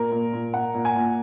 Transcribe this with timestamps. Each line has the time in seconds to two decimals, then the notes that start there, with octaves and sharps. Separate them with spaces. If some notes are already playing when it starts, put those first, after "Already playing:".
Already playing: A#2 A#4
0.12 A#2
0.33 A#2
0.54 A#2 F#5
0.75 A#2
0.85 G#5
0.96 A#2